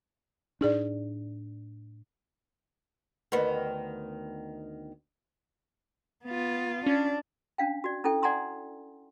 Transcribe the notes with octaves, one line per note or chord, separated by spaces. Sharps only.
A2 D4 D#4 G#4 D5
D2 D#3 B3
B3 F4
C#4 D4
C#4 D4 F5 G5
F#4 D5
C#4 E4 A4 G5
D5 F#5 G#5 A#5 C6 D#6